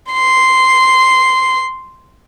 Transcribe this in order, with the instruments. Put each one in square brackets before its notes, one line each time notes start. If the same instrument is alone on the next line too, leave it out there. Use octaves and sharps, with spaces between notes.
[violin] C6 C7